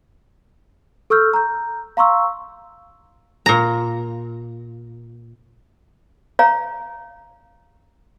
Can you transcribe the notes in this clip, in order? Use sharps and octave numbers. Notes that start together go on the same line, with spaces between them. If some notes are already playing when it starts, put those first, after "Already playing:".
A4 C#6 E6 F6 G6
A#5 G6
F5 A#5 C6 C#6 E6
A#2 A#5
C#5 F5 A#5